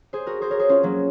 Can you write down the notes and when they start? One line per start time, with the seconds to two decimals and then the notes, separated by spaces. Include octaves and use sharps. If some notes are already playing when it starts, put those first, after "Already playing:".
0.13 G#4 C5
0.27 F#4 A#4
0.41 G#4 C5
0.50 A#4 C#5
0.59 G#4 C5
0.69 C#4 F4
0.83 F#3 A#3